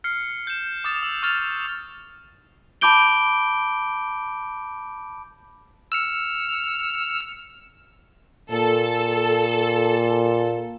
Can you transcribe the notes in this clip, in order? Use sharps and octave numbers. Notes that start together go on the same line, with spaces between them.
F6 C7 C#7
G6 E7
D6 D#6 A6 E7
E6
C#6 F6 A6 F7
A5 B5 D6 G6 D7 G7
E6 F6 C#7
A#2 A4